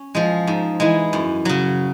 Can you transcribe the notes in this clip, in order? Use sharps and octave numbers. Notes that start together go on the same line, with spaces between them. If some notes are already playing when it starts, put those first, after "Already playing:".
Already playing: C#4
F3 G#3
G#2
E3 G#3
F#2
C#3 F#3